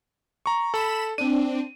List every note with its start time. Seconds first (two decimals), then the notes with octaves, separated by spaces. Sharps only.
0.46 A#5 C#6
0.74 A4 B5 E7
1.18 C4 D4 D#7